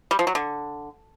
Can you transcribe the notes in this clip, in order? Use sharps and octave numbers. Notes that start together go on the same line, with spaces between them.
G3
F3
F#3
D3